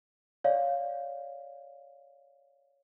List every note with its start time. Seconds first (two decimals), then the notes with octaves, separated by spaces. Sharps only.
0.44 C#5 D5 F5